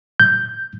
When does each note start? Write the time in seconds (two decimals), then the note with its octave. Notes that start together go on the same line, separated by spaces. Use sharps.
0.20 G6